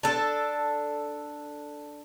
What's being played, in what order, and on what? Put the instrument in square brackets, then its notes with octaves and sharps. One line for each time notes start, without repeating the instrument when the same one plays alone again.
[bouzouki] D4 A4